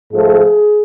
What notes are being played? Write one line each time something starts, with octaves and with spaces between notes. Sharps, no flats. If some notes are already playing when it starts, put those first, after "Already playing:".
G#2 F3 A3 G#4